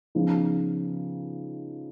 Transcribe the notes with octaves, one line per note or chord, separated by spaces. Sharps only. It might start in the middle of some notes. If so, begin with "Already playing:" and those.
C#3 F3 B3 D#4